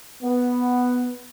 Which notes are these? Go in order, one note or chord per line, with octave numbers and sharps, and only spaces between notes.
B3